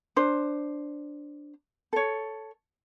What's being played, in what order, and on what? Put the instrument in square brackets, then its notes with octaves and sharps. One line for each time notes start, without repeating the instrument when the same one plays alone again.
[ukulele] D4 C5
A4 C#5